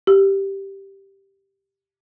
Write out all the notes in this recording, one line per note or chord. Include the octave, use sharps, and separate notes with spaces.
G4 E6